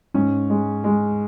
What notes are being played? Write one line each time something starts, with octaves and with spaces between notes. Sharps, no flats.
G#2 C#4
G#3
G#3